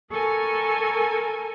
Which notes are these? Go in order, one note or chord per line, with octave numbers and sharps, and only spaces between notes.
A4 A#4 G#5 C#6